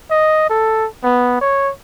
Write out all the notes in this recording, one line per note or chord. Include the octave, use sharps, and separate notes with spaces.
D#5
A4
B3
C#5